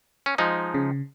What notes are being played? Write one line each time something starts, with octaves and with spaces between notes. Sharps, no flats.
C#4
F3 G#3 D#4
C#3